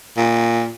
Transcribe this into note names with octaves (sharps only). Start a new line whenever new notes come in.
A#2